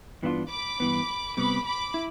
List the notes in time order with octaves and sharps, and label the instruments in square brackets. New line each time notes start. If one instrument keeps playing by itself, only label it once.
[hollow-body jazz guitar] G2 E3 B3 D4 F4
[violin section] B5 D6
[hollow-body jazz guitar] G2 E3 B3
[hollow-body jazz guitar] C3 G3 B3 [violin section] B5 D6
[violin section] B5 D6
[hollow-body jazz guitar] E4